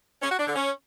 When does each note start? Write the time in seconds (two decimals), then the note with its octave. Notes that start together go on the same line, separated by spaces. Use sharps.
0.22 C#4
0.30 F#4
0.39 D4
0.47 D3
0.55 C#4